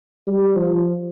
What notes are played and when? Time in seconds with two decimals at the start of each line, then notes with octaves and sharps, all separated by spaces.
0.27 G3
0.55 F3